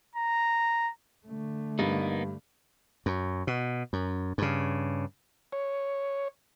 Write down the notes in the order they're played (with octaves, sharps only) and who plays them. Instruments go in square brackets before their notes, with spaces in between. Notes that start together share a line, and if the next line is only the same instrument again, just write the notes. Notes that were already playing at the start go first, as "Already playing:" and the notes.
[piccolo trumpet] A#5
[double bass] D3 A3
[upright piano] G2 [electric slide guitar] A#3 B3 D#4
[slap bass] F#2
B2
F#2
G2 C#3
[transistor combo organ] C#5